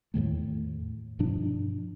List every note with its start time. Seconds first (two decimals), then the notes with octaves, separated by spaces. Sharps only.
0.14 E2 A2 D#3 A3
1.19 G2 B2 F3 D4